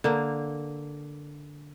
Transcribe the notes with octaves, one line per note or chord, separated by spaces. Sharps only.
D3 A#3